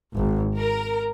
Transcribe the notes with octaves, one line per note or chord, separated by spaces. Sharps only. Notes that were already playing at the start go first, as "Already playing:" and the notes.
G#1
A#4